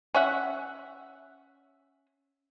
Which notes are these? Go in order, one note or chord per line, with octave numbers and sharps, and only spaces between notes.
C#4 E5 F#5